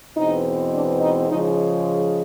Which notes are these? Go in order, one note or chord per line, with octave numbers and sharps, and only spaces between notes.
E2 B2 G#3 C4 D#4
D4
D#4
C#3 F3 G#3 D#4